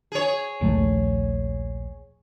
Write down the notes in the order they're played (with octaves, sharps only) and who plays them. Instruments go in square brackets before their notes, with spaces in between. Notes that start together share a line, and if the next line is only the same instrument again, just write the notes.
[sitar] G#4 C#5
[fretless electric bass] A#1 D#2 A3